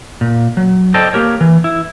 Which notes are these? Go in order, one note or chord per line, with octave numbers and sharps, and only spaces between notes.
A#2
F#3
A4 C5 D5 D#5 G5 A5
A#3 G4 A#4 C#5
E3
E4